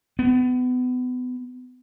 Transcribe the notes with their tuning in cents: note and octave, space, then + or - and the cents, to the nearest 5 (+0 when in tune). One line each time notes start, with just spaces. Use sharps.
B3 +30